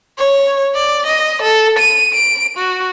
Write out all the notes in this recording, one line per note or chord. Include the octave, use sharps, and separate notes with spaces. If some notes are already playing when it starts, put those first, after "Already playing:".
C#5
D5
D#5
A4
D#7
D7
F#4